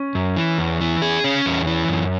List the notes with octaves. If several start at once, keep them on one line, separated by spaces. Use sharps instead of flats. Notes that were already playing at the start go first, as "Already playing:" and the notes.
Already playing: C#4
F#2
E3
E2
E3
G#4
C#4
E2
E3
F#2